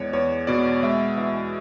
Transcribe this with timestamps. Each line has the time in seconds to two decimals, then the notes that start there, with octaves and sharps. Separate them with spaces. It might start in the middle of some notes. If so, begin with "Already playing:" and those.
Already playing: E2 G#3 C#5 D5
0.13 E2 C#5
0.47 B2 D5
0.83 G#3 E5
1.17 E2 E5